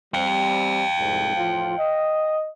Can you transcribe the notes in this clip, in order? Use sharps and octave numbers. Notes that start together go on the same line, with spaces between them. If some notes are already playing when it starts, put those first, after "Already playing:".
G3 C4 F5 G5
C2 F2 G#2
A2 F3 F4
D#5